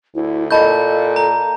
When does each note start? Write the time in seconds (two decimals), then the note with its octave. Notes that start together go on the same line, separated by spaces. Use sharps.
0.15 D2 E4
0.51 A#2 A4 D#5 A5 B5 C#6 G6
1.16 A#5